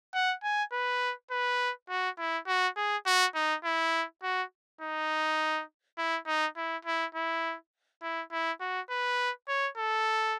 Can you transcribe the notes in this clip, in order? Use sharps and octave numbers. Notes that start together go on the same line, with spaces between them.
F#5
G#5
B4
B4
F#4
E4
F#4
G#4
F#4
D#4
E4
F#4
D#4
E4
D#4
E4
E4
E4
E4
E4
F#4
B4
C#5
A4